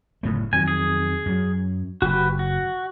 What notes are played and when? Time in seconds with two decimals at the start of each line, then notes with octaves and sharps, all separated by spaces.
0.23 F#1 A2 A3
0.53 F2 D#3 F#3 G#5
0.68 G#4
1.26 F#2 F#3
2.02 F#1 F#4 G4 B4
2.39 F#4